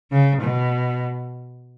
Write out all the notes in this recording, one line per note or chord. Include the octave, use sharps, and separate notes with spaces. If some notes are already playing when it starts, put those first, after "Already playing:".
C#3
B2